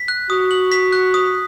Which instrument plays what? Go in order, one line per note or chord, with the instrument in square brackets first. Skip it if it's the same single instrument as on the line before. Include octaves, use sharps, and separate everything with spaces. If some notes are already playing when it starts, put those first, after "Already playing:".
Already playing: [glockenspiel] B6
F#6
[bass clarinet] F#4 [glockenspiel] D#6
[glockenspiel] F#7
B6
F#6
D#6